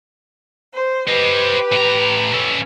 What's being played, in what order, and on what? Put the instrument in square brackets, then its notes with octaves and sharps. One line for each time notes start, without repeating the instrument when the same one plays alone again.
[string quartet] C5
[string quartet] G4 B4 [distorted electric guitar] C5 D#5
[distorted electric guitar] A2 A#5
C#4 A4